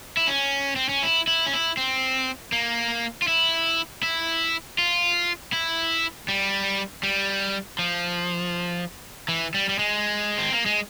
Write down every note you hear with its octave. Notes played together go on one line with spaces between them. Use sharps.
E4
C#4
C4
C#4
E4
E4
C#4
E4
C4
A#3
F4
E4
E4
F4
E4
G3
G3
F3
E3
G3
G3
G#3
C4
A#3
G#3